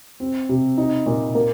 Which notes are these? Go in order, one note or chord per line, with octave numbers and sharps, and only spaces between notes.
C4
C3
D#4
A#2
A#3